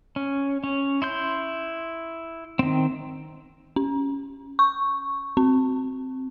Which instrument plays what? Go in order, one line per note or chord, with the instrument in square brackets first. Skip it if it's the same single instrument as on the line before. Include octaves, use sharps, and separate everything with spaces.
[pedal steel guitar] C#4
C#4
E4 C6 G6
D#3 C4
[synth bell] C#4
C#6
C4